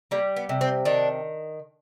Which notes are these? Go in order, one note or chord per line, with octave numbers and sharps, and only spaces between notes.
G3 A#3
B3
C3
C4
D#3 D4